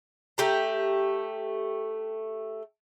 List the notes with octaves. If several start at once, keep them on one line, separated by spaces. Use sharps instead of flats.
A3 G4 A#5